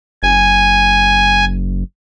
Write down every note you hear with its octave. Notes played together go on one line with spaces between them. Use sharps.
F#1 G#5